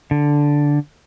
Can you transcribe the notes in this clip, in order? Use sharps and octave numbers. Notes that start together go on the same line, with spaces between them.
D3